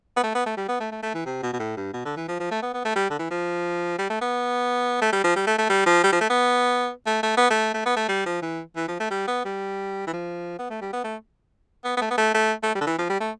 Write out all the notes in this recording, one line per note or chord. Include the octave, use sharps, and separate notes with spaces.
B3
A3
B3
A3
G3
B3
A3
A3
A3
E3
C3
B2
B2
A2
G2
B2
D3
E3
F3
F3
A3
B3
B3
A3
G3
D3
E3
F3
G3
A3
B3
A3
G3
F3
G3
A3
A3
G3
F3
G3
F3
A3
B3
A3
A3
B3
A3
A3
B3
A3
G3
F3
E3
E3
F3
A3
G3
B3
G3
E3
F3
B3
A3
G3
B3
A3
B3
B3
A3
B3
A3
A3
A3
G3
D3
E3
F3
G3
A3